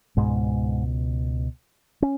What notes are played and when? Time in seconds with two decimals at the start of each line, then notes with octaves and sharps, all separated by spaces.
0.17 C#2 G#2 B2 G#3
2.02 C#4